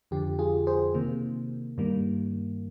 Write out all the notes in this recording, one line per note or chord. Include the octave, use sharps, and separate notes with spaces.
F2 D3 F3 G4
F4 G#4
G#4 C5
C3 D#3 A#3
G2 D#3 G3 A#3